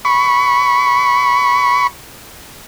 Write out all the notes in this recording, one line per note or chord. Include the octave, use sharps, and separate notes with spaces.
B5 C#6